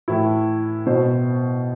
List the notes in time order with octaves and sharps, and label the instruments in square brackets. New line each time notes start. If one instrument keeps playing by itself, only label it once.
[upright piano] A2 E3 E4
B2 C5